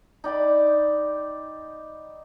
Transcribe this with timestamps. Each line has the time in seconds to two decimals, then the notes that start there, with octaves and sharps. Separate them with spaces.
0.24 D#4 D5 G5 B5